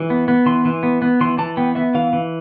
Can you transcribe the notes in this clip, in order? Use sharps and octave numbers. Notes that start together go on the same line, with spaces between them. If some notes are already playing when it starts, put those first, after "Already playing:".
Already playing: E3
B3
B3
E3 C6
E3
B3
B3
E3 C6
E3 A5
B3 G5
B3 E5
E3 F5
E3